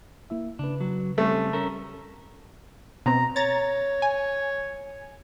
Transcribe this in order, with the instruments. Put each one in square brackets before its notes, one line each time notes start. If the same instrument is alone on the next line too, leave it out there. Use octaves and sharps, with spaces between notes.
[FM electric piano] A#3 E4 E5
[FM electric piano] C#3 B4 [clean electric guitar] D4
[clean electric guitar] F#3
[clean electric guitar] G3 C4 C#4 [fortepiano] A3
[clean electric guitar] C#4 A4 A#4
[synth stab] B2 C4 [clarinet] A#5
[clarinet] C#5 [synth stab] A#5 A6
[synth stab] G#5